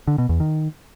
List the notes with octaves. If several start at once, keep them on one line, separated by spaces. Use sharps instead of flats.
D3
B2
E2
D#3